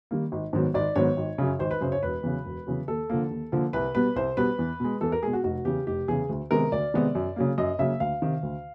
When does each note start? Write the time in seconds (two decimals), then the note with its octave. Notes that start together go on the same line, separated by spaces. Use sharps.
0.11 D#3 G3 A#3
0.32 G#1
0.53 G#2 D#3 F#3 B3
0.74 G#1 D5
0.96 G#2 D#3 F#3 B3 C#5
1.17 G#1
1.38 F#2 C#3
1.59 G#1 C5
1.71 B4
1.81 F#2 C#3 C5
1.92 C#5
2.02 E1 B4
2.23 E2 C#3 F#3
2.45 E1
2.67 E2 C#3 F#3
2.88 D#2 A4
3.10 D3 F3 A#3
3.31 D#2
3.52 D3 F3 A#3
3.73 C2 B4
3.95 B2 G3 B3 B4
4.16 C2 C5
4.37 B2 G3 B3 B4
4.59 E2
4.80 B2 G#3
5.01 E2 A4
5.12 A#4
5.23 B2 G#3 G#4
5.33 F#4
5.44 F1 F#4
5.65 E2 C#3 G4
5.87 F1 G4
6.08 E2 C#3 G#4
6.29 D2
6.51 C3 D#3 G#3 B3 A#4
6.72 D2 D5
6.94 C3 D#3 G#3 B3
7.15 F#2
7.36 C#3 F#3 A#3
7.58 F#2 D#5
7.79 C#3 F#3 A#3 E5
8.00 D2 F5
8.22 C3 D#3
8.43 D2